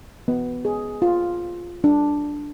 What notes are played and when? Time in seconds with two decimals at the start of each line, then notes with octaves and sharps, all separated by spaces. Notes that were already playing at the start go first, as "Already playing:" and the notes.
0.28 B3
0.65 G#4
1.02 F4
1.84 D4